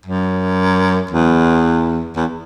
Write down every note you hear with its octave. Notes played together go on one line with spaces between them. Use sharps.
F#2
E2
E2